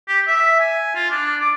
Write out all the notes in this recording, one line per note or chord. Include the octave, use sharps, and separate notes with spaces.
G4
E5
G#5
F4
D4
D6